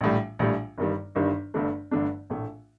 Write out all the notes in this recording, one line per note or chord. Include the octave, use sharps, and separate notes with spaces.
A#1 A2 G3
A#1 A2 G3
G1 G2 D#3 G3
G1 G2 D#3 G3
G1 G2 D3 A3 D4
G1 G2 D3 A3 D4
A#1 A2 A3